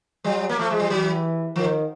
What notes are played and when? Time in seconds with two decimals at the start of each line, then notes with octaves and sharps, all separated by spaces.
0.24 F#3 G3
0.49 A#3
0.58 F3 A3
0.70 G#3
0.80 G3
0.90 E3 F#3
1.56 D#3 F3